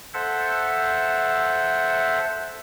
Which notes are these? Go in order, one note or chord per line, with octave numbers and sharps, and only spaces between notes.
A4 C5 E5 F#5